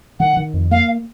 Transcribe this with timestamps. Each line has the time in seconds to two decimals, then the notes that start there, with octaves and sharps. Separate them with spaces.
0.20 D#3 F#5
0.37 D#3
0.54 F2
0.71 A#3 F5